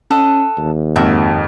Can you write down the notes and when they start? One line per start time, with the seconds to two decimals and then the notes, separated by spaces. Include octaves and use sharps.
0.11 C#4 A4 D#5 F#5
0.58 D#2
0.96 F2 G#2 A#3 F#4 E5